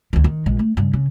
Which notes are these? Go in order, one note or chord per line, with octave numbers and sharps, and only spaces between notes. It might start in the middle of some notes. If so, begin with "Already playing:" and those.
D2 D#3
D#3
A#1 G#3
A3
G2 C#3
C#3